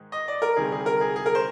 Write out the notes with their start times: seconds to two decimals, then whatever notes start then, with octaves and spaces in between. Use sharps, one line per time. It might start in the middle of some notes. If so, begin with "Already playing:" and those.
Already playing: G#2 D#3 G#3
0.12 D#5
0.28 D5
0.42 A#4
0.56 D2 C3 D#3 G3 G#4
0.72 G#4
0.86 A#4
1.01 G#4
1.16 G#4
1.26 A#4
1.35 C5